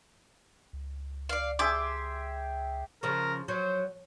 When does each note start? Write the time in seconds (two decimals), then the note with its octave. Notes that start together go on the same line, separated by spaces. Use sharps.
0.73 C#2
1.29 D5 F5
1.59 G4 G#4 E5 C6 D6
3.03 C#3 F3 A#4
3.48 F#3 C5